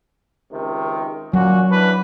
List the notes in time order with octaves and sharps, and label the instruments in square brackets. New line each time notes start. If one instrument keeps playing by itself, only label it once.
[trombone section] C#2 C3 D#3
[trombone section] A#2 C#4 F#4 [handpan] F#3
[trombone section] E3 D4 B4